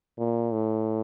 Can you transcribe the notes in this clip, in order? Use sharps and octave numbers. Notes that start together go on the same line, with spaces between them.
A#2
A2